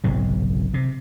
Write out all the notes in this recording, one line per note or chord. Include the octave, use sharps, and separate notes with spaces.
F#1 B1 G#2 C3
C3